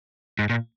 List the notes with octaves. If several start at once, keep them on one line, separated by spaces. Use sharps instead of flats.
G#2
A#2